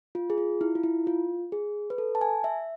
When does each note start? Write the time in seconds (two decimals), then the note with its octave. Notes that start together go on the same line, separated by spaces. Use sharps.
0.15 F4
0.30 G#4
0.38 F4
0.61 E4
0.75 F4
0.83 E4
1.07 F4
1.52 G#4
1.90 B4
1.98 A4
2.15 A5
2.21 G#5
2.44 E5